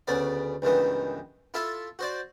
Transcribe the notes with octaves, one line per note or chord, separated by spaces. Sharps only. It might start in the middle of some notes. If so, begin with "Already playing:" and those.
D2 C#3 B3 D5
C#2 G2 D#3 E3 B3
E4 F4 A4 E5
F#4 C5 D5